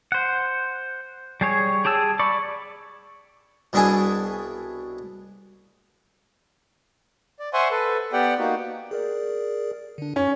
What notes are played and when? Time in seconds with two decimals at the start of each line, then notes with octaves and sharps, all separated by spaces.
0.12 C5 F#5
1.41 G3 G#4 C#5
1.85 G4 G#4 A5 E6
2.19 D5 B5 C#6 D6
3.73 C2 B2 D4 E4 G#4 G#5
7.39 D5
7.53 C5 E5 F#5 G#5 C6 C#6
7.71 A4 B4
8.13 B3 G4 D5 F#5 G5
8.39 A#3 D#4 F#4
8.91 G#4 A#4 D5
9.98 D3 D4
10.16 F#2 C#4